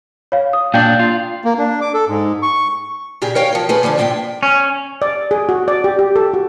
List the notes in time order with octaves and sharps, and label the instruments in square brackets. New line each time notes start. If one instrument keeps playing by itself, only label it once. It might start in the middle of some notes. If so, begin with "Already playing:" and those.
[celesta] C#5 F5
D#6
[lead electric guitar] A#2 D4 [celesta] F5 G5 G6
[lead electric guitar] F4
[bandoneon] A#3
D4
D6
A4
G#2
C#6
[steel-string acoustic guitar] A#2 C#3 G4 G#4
A#4 C#5 F5 G5
F3 A#4
A3 F4 G#4 B4
D3 F3 A3 D4
A2 A#3 F4 E5 G5
[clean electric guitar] C#4
[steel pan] D5
G#4
F#4
D5
G4
G4
A4
F#4